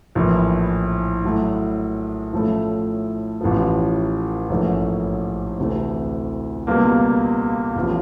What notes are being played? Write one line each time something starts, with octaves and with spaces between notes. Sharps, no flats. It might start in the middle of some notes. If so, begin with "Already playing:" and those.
A#1 A2 E3
A2 F#3 A3
A2 F3 A3 C#4 E4
A1 A2 F3
A#1 G#2 E3 A3 C#4
D2 C3 E3 A3
C#2 B2 G3 A#3
A1 A2 F3